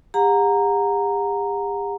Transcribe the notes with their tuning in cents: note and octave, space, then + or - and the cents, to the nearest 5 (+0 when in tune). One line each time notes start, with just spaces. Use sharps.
G4 +45 F#5 -30 A#5 -5